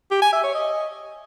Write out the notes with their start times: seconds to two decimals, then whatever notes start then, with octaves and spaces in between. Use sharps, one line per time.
0.11 G4
0.22 G#5
0.33 E5
0.44 C#5
0.55 D#5